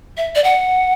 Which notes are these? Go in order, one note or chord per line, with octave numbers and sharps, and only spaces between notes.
E5
D5
F#5